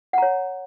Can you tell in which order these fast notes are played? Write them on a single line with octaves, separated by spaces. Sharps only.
F#5 A#5 C#5